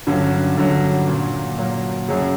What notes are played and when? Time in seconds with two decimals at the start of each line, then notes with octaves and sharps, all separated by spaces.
0.07 G2 D3 F#3 C#4
0.57 G2 D3 F#3 C#4
1.08 A#2 F#3 A#3
1.58 A#2 F#3 A#3
2.08 F#2 C#3 F#3